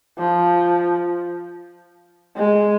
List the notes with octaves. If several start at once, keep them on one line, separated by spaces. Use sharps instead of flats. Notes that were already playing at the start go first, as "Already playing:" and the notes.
F3
G#3